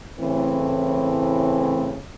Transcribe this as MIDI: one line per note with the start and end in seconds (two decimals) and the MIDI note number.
0.20 1.97 45
0.20 1.97 49
0.20 1.97 52
0.20 1.97 57
0.20 1.97 60